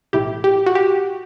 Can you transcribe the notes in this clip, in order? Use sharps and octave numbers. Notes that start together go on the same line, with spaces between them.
B1 A2 E3 G4
G4
F#4
G4